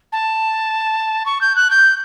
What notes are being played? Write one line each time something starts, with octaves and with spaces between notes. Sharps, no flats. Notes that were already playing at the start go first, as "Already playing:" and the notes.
A5
C#6
G6
F#6
G6